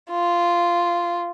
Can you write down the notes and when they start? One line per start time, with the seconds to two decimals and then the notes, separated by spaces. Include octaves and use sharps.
0.10 F4